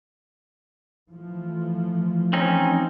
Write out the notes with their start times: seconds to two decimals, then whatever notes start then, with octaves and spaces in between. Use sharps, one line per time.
1.10 E3 F3 A3
2.33 C4 C#4 D#4